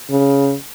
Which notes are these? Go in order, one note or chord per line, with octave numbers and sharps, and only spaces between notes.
C#3